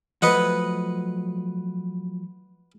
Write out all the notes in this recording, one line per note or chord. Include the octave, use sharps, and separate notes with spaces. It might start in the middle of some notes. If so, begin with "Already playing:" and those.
F3 F#3 A3 B4 D#5 F#5